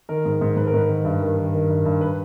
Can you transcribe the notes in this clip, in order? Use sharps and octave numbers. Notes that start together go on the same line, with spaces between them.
D#3 A#4
G#2
G#2
G#2 B4
A#4
G#2 B4
D#3
G2
D#3
D#3
D#3
G2
G2
B4